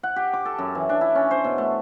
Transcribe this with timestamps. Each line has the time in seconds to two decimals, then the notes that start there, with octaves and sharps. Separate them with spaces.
0.03 F#5
0.16 G4
0.33 D6
0.45 A4
0.58 F#2
0.75 E3
0.89 D4
1.01 E4
1.15 C#4
1.31 C5
1.44 B2
1.58 A3